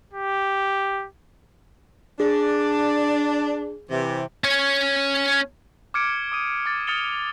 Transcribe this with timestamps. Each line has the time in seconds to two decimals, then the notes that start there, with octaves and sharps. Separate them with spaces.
0.13 G4
2.20 D4 G#4
3.90 C3 E3
4.44 C#4 C#5
5.94 D6 F6 G#6 C#7 D7
6.32 D6 D#6 D#7
6.66 D6 A6
6.87 D#6 F6 A6 C#7 F7 G7